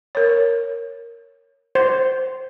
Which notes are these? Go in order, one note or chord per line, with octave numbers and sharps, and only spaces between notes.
A#4 C#5
C5